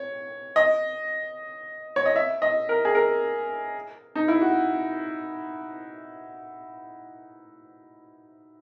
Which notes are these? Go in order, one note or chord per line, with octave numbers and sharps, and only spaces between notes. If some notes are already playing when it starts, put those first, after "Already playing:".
Already playing: C#5
D#5
C#5
D#5
E5
D#5
A#4
G#4
A#4
D#4
E4
F#4